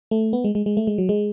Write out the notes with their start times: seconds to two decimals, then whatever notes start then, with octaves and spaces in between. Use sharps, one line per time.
0.11 A3
0.33 B3
0.44 G#3
0.55 G#3
0.66 G#3
0.77 A3
0.87 G#3
0.98 F#3
1.09 G#3